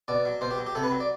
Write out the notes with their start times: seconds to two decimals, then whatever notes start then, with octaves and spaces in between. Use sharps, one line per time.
0.08 B2 D5
0.25 F#3
0.41 B2 C5
0.50 G4
0.58 F#3
0.67 G4
0.75 C3 A4
0.83 B4
0.91 F#3
1.00 D5